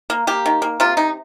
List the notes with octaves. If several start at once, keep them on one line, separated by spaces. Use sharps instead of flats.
A#3
A#3 G4
D#3
A#3
C3 F4
C3 D#4